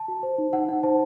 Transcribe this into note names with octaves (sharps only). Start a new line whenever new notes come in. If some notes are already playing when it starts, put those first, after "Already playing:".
Already playing: A5
F#4
C5
D#4
D#4 F#5
D#4 F#5
C5 A5